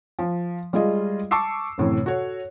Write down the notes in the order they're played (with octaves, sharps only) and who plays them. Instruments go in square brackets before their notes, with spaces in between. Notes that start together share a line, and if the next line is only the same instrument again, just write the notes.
[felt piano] F3
G3 G#3 F4 G#4 D#5
A5 C#6 D6 E6 C7
F#2 A2 C3 E3
F#4 A4 C#5